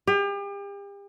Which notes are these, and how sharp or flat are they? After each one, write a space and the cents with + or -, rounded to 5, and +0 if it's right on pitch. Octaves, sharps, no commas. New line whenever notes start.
G4 +40